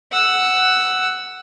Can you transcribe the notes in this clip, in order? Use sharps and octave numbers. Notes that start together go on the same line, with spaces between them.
F#5 E6